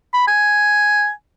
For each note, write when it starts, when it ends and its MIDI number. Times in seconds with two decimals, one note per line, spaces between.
0.13 0.27 83
0.27 1.10 80